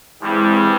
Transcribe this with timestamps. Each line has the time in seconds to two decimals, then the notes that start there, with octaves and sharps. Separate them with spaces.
0.23 G2 E3 G3 G#3 C4